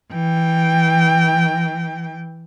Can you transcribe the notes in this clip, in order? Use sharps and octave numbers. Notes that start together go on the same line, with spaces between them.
E3 G5